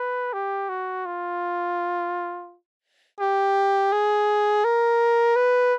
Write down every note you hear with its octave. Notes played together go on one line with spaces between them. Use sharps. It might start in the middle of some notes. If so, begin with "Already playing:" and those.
Already playing: B4
G4
F#4
F4
G4
G#4
A#4
B4